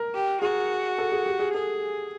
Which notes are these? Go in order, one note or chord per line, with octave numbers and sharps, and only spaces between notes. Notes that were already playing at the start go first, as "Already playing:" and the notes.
Already playing: A#4
G4
F#4 G#4
A4
G#4
G4
G#4
G#4 A4